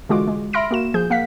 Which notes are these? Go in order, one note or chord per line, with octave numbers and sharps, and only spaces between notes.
D3 E3 G#3 F4 F#4 D6
G#3
E5 B5 C6 F6 A#6 D7
A#3 F#4 E7
F3 G#4 G6
A#3 F5 F#5 B6